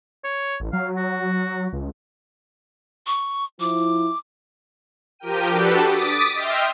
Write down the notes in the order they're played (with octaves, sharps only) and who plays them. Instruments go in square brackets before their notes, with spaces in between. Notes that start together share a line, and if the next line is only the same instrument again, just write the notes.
[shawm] C#5
[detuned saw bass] A1
[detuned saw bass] F#3 [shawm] F5
[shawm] F#4
[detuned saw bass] C#2
[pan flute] C#6
[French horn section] F3 E4 [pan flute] D6
[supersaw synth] F3 G4 A#4 G5 D#7
D4 F#4 G4 A4 B4
D6 D#6 A6 B6
D#5 E5 G5 C6 F6